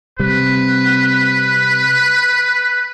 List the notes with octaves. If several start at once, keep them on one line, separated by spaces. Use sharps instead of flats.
C3 G3 C4 B4